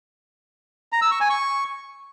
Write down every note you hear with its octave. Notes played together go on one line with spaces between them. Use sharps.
A#5
E6
C#6
G#5
C#6